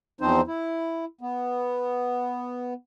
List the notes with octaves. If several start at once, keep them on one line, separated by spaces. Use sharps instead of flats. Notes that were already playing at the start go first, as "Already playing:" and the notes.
E2 F3 C4 D#4 C5
E4
B3